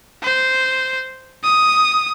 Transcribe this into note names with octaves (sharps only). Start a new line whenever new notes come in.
C5
D#6